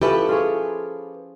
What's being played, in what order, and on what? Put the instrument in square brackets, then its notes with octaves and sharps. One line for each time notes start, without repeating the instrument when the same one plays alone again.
[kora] F3 C#4 E4 [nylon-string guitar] G4 A4 B4
[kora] F4 G#4 C#5